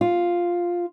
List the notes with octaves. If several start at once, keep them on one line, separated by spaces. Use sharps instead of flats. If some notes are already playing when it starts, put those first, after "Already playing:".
F4